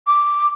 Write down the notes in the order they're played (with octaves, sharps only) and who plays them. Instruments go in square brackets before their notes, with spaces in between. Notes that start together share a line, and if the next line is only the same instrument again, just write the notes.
[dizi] D6